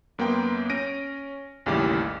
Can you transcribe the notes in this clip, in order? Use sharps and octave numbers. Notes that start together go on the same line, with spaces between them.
F#2 A#3 B3 G5 C6
C#4 A#6 D7 D#7
A1 D#2 C#3 G3 E4 D6